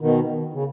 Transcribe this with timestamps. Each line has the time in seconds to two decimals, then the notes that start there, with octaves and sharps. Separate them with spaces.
0.01 B2 D#3
0.53 C#3